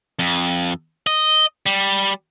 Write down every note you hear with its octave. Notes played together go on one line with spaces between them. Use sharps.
F2
D#5
G3